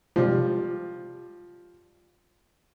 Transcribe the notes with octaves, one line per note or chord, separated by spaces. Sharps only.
C3 F3 G3 G#3